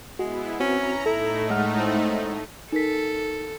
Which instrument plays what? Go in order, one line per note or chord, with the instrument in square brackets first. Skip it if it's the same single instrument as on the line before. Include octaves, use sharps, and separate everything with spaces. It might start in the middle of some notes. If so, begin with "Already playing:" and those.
[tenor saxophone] G#3 [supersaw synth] B3 E4 [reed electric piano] F#4
[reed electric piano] C4 F#4 [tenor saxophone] C#4 [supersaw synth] A#5
[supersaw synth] A2 A3 D#4 [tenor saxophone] E4 [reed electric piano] A4
[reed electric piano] G#3 F#5 F6
[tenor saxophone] C4
[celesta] D#4 A#4 B6 [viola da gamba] A4